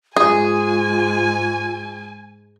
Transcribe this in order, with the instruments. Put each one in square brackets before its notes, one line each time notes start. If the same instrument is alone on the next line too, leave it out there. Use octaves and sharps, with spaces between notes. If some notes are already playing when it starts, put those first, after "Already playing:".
[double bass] G#2 G#3 [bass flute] F4 [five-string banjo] G#4 [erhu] G#5